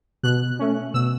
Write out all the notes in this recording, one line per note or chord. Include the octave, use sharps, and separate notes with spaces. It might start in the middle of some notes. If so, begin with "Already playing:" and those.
B2 F#6
A3 C#4
B2 E6